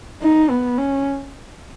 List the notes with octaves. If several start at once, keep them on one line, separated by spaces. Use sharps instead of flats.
D#4
B3
C#4